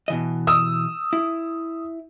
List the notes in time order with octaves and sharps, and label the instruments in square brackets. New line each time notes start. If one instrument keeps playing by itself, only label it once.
[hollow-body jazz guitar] B2 E3 D#5
[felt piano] D#6 E6
[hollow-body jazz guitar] E4